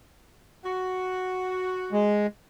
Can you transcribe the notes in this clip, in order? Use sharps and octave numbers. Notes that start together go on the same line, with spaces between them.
F#4
G#3